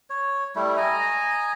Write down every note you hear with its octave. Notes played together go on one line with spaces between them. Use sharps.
C#5
G3 A3 E4
D#5 G#5 A#5